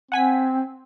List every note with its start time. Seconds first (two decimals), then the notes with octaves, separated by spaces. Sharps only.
0.12 C4 F#5 G#5 B6